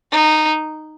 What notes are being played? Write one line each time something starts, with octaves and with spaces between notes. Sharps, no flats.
D#4